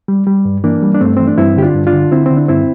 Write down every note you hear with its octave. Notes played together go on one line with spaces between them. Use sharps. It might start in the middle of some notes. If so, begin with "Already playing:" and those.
G3
G3
G2
E3 A#3 D4
G3
D4
G2 A3 C4
E3 C4
D4
G2 C4 E4
D3 G4
D4 F4
G2
D4 F4
D3
D3 C4 E4
D3 C4
D4
G2 C4 E4